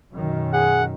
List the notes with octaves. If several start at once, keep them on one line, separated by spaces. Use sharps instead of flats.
F#2 B2 D#3
G#4 F#5